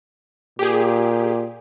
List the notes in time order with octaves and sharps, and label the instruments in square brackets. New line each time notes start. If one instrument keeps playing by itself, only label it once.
[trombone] A#2 [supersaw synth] G4 G#4